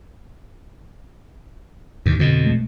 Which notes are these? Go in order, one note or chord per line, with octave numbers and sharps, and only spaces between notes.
D#2 G#2 D#3
F2 B2 D3
B1 G#3 A3